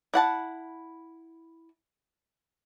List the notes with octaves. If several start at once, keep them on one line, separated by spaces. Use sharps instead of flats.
E4 F#5 A5